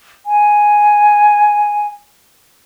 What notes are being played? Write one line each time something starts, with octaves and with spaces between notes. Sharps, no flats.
G#5